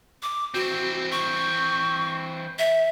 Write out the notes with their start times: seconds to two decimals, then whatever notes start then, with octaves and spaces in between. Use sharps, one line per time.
0.22 D6
0.54 E3 C4 F#4
1.12 C#6
2.59 E5